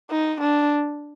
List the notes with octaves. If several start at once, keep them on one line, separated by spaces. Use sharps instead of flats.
D#4
D4